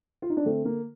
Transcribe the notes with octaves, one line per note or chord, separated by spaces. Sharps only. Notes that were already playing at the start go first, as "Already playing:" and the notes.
F4
D#4
D4
D3 A3 C4
A#3